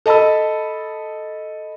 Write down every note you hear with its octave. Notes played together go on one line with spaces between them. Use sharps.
A4 D#5 A5 B5 E6